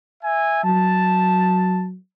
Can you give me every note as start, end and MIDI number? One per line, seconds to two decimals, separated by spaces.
0.22 0.63 76
0.22 0.63 80
0.64 1.96 54
0.64 1.85 81